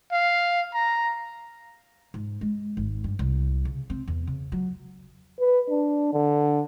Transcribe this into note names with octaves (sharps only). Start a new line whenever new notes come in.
F5
A#5
G#2
G#3
G#1
G2
C2
C#3
C4
E2
C#3
F#3
B4
D4
D3